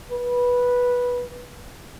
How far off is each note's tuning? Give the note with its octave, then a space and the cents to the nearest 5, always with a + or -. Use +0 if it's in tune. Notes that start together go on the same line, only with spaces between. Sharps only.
B4 -10